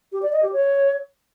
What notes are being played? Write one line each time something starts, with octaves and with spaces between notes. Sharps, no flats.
G4
D5
D#5
G4
C#5